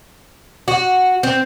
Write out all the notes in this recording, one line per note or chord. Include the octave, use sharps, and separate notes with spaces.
F#4
C4